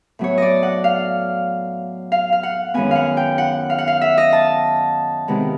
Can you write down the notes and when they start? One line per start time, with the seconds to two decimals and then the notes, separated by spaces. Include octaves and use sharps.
0.19 A2 F#3 B3 C#5
0.38 D5 D#5
0.63 F#5
0.84 F5
2.12 F5
2.32 F5
2.43 F#5
2.74 F#2 D#3 G#3 B3 G#5
2.91 F5 F#5
3.17 G5
3.38 F#5
3.70 F5
3.78 F#5
3.88 F5
4.01 E5
4.18 D#5
4.33 A5
5.28 C3 D#3 G#3 B3